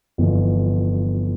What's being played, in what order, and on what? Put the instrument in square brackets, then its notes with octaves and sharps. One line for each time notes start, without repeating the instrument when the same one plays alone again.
[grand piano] G1 F2 E3